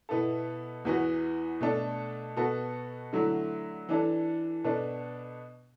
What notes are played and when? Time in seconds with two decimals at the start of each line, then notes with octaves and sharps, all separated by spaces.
0.09 B2 B3 E4 A4
0.85 E2 E3 B3 F#4
1.61 B2 A3 D4 A4
2.37 B2 B3 F#4 A4
3.13 D3 F#3 A3 E4
3.89 E3 D4 A4
4.64 B2 B3 D4 A4